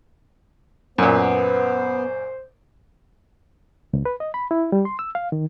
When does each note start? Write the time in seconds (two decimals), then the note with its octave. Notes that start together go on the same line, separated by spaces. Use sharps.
0.98 F#2 A#2 B3 C5
3.93 C#2
4.05 B4
4.20 D#5
4.34 B5
4.51 E4
4.72 G3
4.85 C6
4.99 E6
5.15 F5
5.32 D#3